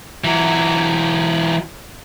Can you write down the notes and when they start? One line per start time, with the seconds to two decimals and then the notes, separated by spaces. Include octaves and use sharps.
0.24 E3 F#3